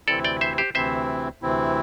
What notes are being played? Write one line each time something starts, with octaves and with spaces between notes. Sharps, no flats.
D2 C3 E3 C4 E4 A4 D5
D5 G5
C5 E5
G4 C5
D2 C3 E3 C4 E4 C5 E5
D2 C3 E3 C4 E4